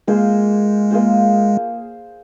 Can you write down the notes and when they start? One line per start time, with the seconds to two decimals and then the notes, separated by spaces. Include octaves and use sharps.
0.07 G#3 A#3 F4 G#4 C5
0.91 A#3 F4 G#4 C5